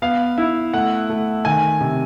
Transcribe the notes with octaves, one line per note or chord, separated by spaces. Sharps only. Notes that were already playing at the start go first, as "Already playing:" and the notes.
B3 F5
E4
A3 F#5
A3
D#3 G#5
C3